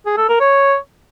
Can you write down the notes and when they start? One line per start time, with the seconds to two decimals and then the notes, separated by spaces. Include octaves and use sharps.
0.06 G#4
0.18 A4
0.29 A#4
0.40 C#5